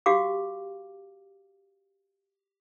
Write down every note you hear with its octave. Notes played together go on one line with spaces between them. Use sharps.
F#4 G4 F5 D6